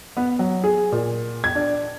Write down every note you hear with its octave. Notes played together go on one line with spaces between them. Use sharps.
B3
F#3
G#4
A#2
G#6
D4